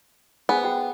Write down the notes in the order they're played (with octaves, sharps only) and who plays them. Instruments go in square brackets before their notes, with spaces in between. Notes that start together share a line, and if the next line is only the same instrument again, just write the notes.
[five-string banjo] B3 [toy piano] G#4 C5 G#5
[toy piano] F#4 G5